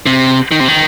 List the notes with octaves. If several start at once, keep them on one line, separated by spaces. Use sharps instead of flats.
C3
D#3
C3
D#3